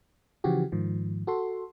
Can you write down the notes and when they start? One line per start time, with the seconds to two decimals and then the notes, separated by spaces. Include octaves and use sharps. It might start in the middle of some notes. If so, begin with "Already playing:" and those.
0.44 C#3 E3 F3 F#4 G4
0.72 G#2 D#3 F3
1.27 F#4 A4 C6